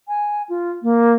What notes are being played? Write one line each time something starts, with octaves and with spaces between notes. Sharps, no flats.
G#5
F4
A#3